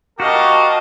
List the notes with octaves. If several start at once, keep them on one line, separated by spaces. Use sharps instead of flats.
F#4 G4 A#4 D#5 F5 A5